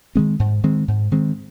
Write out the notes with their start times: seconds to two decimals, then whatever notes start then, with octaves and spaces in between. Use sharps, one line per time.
0.15 D#3 G#3 C4
0.39 G#2
0.63 D#3 G#3 C4
0.88 G#2
1.12 D#3 G#3 C4